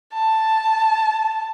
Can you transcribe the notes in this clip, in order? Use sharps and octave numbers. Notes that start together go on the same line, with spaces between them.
A5